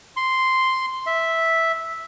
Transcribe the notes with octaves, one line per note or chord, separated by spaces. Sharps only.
C6
E5